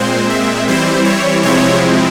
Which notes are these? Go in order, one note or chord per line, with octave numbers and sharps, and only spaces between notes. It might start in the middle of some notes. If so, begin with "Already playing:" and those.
Already playing: A#2 G#3 C4 C5
E5
E3 G3 C4 E4 C5
C#5
C3 F3 G#3 C4 E4 C#5